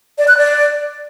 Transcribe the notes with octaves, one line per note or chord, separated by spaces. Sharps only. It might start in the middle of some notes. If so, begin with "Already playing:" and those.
D5
F#6
D5